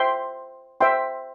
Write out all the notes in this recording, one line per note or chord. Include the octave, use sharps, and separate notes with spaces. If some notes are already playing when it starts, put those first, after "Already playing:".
Already playing: C5 E5 G5 C6
C5 E5 G5 C6